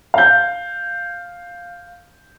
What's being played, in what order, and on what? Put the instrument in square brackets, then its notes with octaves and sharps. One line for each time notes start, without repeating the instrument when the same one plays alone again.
[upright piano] F5 G6